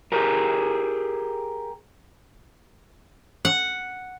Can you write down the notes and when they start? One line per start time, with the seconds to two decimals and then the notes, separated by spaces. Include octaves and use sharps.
0.12 G4 G#4 A#4
3.45 F#5